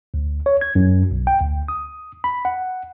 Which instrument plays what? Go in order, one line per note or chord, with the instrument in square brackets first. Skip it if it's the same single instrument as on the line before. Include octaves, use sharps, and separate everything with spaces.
[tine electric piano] D2
C#5
G#6
F#2
B1
G5
D2
D#6
B5
F#5